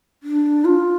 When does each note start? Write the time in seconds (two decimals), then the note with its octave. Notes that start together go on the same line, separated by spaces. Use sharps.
0.23 D4
0.65 F4